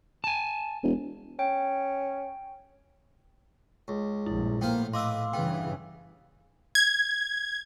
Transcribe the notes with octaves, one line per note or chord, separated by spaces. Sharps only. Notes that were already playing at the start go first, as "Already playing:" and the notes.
G#5 A5
E1
C#4 G5
C#2
A#1 G2 E4
A2 A#3 B3 C5 F5 G5
B4 D#5 F5 C6 D6 E6
G2 C#3 E3 B3 G5
G#6